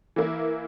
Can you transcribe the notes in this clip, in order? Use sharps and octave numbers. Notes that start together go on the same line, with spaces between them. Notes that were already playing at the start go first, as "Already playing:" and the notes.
E3 A#3 E4